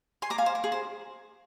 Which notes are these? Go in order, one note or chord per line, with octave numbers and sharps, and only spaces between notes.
G#5 C6
A#5 D6
F5 G#5
C5
A#4
G#4
C5